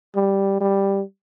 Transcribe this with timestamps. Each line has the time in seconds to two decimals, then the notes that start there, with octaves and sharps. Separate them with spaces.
0.15 G3
0.61 G3